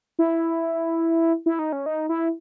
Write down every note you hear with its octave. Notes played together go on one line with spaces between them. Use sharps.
E4
E4
D#4
C#4
D#4
E4